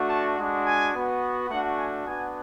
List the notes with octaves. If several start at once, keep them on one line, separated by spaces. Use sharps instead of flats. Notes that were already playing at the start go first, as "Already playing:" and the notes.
Already playing: A3 D4 F#4
A5
G#3 D4 F#4
G#5
B3 F#4
A3 D4 F#4 F#5
G#5
B3 D4 F#4 G#5